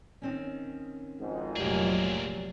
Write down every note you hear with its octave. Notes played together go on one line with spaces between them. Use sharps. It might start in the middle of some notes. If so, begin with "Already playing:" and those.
D#3 C4 C#4
G#1 F2 G#2
F1 A#1 F#3 A#3 G4 G#4 D5